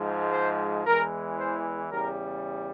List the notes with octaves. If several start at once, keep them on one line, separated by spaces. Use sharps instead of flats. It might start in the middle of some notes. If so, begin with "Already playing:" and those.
Already playing: G#2 F3 G#3
C5
E2 E3 G#3 A#4
C5
E2 C#3 G3 A#4